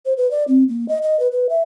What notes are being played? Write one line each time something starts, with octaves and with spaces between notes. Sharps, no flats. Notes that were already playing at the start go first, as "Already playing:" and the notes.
C5
B4
D5
C4
A#3
D#5
D#5
B4
B4
E5